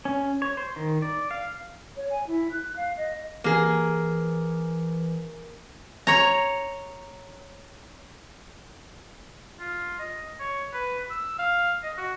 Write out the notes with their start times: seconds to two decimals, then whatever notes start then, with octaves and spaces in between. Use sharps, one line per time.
0.05 C#4
0.42 C#5
0.57 C5
0.76 D#3
1.02 D5
1.31 F5
1.97 C#5
2.10 G#5
2.27 E4
2.52 F#6
2.76 F5
2.97 D#5
3.44 E3 A#3 G#4
6.07 C#5 A#5
9.60 F4
9.99 D#5
10.39 C#5
10.73 B4
11.10 E6
11.39 F5
11.83 D#5
11.97 F#4